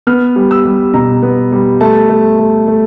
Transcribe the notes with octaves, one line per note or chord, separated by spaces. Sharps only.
B3 F6
G3
E6
G3
B2 A#5
B3
G3
A3 A5
A3
A3
A3